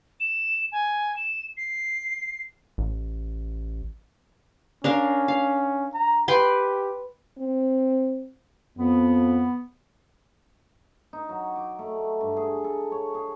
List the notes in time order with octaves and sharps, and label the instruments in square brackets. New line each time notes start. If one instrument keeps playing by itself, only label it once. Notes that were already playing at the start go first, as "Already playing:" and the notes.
[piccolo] E7
G#5
E7
C7
[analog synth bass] A1
[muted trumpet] C#4 [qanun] D4 A#4 F5
[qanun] F5
[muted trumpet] A#5
[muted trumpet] G4 [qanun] B4 G5 C6
[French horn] C4
[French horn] F2 [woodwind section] B3
[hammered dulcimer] D#4
F#3
D6
A3
G2
G#4
A4
C#5
G#4